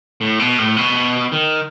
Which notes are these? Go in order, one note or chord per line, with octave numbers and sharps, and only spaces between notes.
A2
B2
A2
B2
D#3